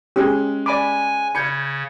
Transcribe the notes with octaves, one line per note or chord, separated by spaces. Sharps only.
G#3 C#4 G4 G#4
D5 G#5 B5 D6
C#3 B5 G6 G#6 C#7